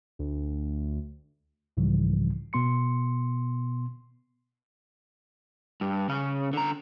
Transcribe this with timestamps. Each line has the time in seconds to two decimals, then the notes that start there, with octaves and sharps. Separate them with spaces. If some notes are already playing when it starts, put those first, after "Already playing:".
0.19 D2
1.77 C2 G#2 C#3 E3 F3 G3
2.53 B2 B3 C6 C#7
5.81 G2
6.09 C#3 C#4
6.53 D3 A#5